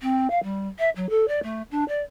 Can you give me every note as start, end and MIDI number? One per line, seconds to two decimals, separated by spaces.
0.01 0.28 60
0.30 0.41 77
0.43 0.68 55
0.79 0.89 76
0.96 1.09 54
1.09 1.25 69
1.28 1.40 74
1.43 1.62 57
1.71 1.84 62
1.88 2.01 74